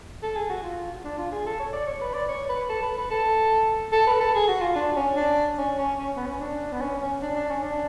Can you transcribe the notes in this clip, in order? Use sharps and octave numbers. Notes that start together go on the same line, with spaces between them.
A4
G#4
F#4
F4
D4
F4
G#4
A4
C#5
D5
C#5
B4
D5
C#5
B4
A4
B4
B4
A4
A4
B4
A4
G#4
F#4
F4
D4
C#4
D4
C#4
C#4
C#4
B3
C#4
D4
B3
C#4
C#4
D4
D4
C#4
D4